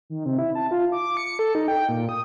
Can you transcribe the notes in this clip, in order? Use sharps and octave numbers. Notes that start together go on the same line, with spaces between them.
D#3
C3
E4
A5
F4
D6
C#7
A4
D#4
G5
A#2
D#6